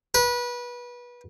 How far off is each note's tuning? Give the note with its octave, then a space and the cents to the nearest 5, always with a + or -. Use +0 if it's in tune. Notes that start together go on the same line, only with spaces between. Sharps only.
B4 -25